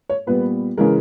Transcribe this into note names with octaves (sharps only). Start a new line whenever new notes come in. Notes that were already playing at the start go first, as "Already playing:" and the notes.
C#5
A#2 G3 B3 B4
C#3 E3 G#3 A#4